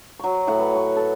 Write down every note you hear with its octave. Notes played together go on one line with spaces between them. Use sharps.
F#3 C#6
A2 F#5
B4
C#6
A4